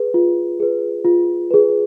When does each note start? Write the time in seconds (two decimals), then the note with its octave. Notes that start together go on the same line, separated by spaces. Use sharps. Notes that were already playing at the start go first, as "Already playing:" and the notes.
Already playing: G#4 B4
0.14 F4
0.60 G#4 B4
1.05 F4
1.51 G#4 B4